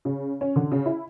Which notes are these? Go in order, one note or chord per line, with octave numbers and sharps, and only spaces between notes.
C#3
C#4
D3
C#3
E4